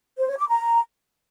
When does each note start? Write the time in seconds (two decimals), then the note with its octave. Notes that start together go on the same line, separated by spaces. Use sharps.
0.18 C5
0.28 C#5
0.39 D6
0.49 A#5